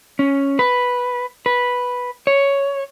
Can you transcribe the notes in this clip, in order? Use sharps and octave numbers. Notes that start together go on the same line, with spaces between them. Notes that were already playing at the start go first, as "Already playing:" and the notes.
C#4
B4
B4
C#5